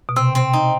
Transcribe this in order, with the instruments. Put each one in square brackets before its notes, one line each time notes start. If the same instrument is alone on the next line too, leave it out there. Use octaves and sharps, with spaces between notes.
[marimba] B2
[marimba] C3 [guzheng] C4
[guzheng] C4
D#4